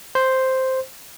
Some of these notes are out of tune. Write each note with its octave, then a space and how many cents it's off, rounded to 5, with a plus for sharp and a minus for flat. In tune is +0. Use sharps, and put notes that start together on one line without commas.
C5 +0